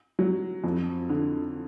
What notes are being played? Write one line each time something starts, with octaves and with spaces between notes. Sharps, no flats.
F#3
F2
D3